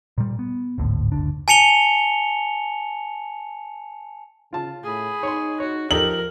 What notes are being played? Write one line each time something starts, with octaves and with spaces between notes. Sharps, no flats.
A#2 G3
B3
G#1 D2 A2
F#1 D2 D4
G#5 A5 C#7 F7 G7
C#3 F4 A5
A2 G#4 B5
D#4 C#5 C6
F#4 C#5
F3 D#4 G4 A4 A#4 F#7